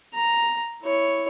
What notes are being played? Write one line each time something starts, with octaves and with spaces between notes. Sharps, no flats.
A#5
E4 C#5